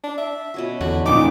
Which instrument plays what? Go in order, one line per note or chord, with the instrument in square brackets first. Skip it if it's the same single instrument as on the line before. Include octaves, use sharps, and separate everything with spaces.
[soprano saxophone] D4
E5
[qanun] B2 C#4 F#4
[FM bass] E2 [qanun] D3 [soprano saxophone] F#4
[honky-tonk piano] F2 A#2 C#3 [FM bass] D#4 [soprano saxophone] D6